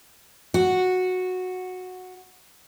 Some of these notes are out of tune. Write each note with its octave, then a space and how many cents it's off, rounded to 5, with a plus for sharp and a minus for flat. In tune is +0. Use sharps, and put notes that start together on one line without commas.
F#4 -10